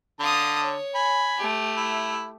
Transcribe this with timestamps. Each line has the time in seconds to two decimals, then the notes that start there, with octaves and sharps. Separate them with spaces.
0.20 D3 F5 A5 D#6
0.63 C#5
0.95 G#5 B5
1.38 A3 G4
1.77 E4